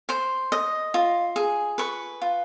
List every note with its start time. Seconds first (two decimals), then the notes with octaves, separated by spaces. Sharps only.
0.09 C5 C6
0.52 D#5
0.94 F4
1.36 G#4
1.78 B4 C#6
2.22 F4